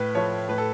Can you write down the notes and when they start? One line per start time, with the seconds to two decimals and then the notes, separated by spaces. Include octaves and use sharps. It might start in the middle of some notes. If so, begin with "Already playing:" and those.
Already playing: A2 B4
0.15 F3 A3 C#5
0.49 A2 B4
0.58 A4